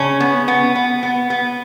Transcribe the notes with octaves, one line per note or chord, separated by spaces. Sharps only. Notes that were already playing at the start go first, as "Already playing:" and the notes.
Already playing: C#3 C#4
B3
B3
B3
B3
B3